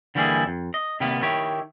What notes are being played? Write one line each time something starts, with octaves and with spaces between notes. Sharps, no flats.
D3 E3 G3 A#3 E4 G#4
F2
D#5
C3 D#3 G3 A#3 B3
D#3 E4 G4 C#5